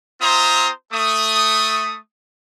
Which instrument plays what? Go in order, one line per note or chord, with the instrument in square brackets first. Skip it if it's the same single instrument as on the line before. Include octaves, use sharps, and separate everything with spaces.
[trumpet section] C4 F4 C5 E5 A#5 D#6
A3 D#6